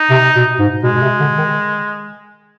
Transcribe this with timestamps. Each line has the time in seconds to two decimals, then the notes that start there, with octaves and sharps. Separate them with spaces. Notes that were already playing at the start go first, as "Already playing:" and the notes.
Already playing: D#4
0.11 C3
0.36 B2
0.59 G#2
0.83 B2 G#3
0.95 B2
1.02 C3
1.20 D3
1.38 D#3